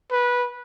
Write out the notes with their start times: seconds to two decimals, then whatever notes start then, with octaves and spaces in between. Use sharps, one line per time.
0.12 B4